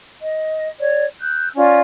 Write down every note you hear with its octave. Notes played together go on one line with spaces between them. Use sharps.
D#5
C#5 D5
E6 F#6 G6
C#4 F4 D5